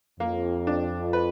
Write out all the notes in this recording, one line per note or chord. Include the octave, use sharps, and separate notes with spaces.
F2 A#3
D4
B4